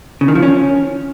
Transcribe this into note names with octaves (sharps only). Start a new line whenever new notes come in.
C#3
D#3
F3
C#4